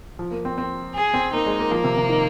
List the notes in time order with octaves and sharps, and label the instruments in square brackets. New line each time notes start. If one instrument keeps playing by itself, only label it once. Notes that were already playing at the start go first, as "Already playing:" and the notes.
[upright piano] F3
A#3
C4
C4
[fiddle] G#4
[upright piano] C4
[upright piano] A#3 [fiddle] D#4
[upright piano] G#3
A#3
[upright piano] F3 [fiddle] A#3
[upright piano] C3
C3
D#3